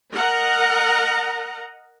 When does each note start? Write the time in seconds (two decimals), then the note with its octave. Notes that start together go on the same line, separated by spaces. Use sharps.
0.14 A#4 D#5 F#5 A#5